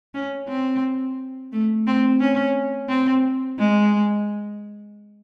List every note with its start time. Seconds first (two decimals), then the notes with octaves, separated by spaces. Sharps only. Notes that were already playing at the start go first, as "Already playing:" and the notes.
0.14 C#4
0.49 C4
1.52 A3
1.87 C4
2.20 C#4
2.89 C4
3.59 G#3